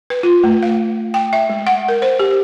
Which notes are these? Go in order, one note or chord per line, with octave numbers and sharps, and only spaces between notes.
B4
F4
A3
F5
G5
E5
G#3
F#5
A#4
C5
G4